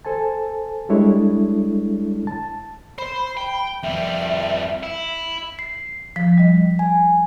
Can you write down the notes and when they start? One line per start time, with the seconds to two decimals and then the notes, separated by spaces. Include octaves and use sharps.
0.05 A4 C5 G#5 A5
0.89 G3 G#3 D4 E4 A4 C#5
2.27 A5
2.99 C5 B5
3.37 G5
3.83 F2 G3 E5
4.83 E4
5.59 C7
6.16 F3 B6
6.38 G3 D#5
6.79 G#5